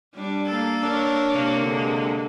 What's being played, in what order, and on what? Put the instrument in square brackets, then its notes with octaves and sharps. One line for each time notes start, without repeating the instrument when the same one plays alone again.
[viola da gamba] G3 D4
[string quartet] A#3 A4
[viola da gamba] D4 A#4 C#5
[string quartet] C3 A#3
[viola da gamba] D3 G#3